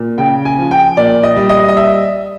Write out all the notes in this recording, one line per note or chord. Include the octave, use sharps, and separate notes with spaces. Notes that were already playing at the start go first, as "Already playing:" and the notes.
Already playing: A#2
C#3 G5
G#5
F3
G5
A#2 D5
D#5
G3
D#5
D#5
E5